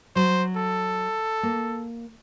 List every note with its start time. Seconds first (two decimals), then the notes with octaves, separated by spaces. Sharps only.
0.16 F#3 C5
0.56 A4
1.43 A#3